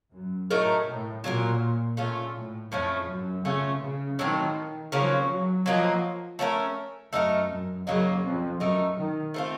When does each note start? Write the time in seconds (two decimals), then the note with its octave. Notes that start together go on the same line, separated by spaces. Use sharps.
0.14 F#2
0.50 A2 F#3 A3 D#4 A#4
0.87 A2
1.24 A#2 F#3 A#3 D#4 A#4
1.97 A#2 A3 C#4 F4
2.35 A2
2.71 F2 A2 F3 A3 C#4
3.08 F#2
3.45 C#3 A3 C#4 F4
3.82 C#3
4.19 A2 D#3 F#3 C4 F4
4.92 C#3 F3 F#3 A#3 C#4
5.29 F#3
5.66 F3 F#3 A#3 D#4
6.39 A3 C#4 F#4 A#4
7.13 F#2 A3 D#4 F#4 A#4
7.50 F#2
7.86 F#2 C#3 F#3 A#3 D#4
8.23 F2
8.60 F#2 A3 D#4 A#4
8.97 D#3
9.34 A3 C4 F4